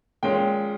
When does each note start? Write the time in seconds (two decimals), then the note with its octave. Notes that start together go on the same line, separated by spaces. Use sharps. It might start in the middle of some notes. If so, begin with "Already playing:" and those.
0.23 A#2 G#3 C#4 G5